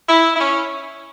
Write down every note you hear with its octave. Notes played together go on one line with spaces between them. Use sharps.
E4
E4
C#4